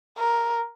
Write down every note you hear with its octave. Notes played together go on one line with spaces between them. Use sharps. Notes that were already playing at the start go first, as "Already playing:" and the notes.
A#4